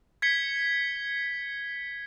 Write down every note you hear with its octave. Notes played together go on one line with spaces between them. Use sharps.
G#6 B6 C#7 G7